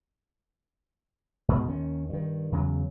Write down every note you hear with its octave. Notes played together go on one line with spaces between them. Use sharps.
G#2 B2
D#2 D#3 C#4
G2 D#3
E2 C#3 F#3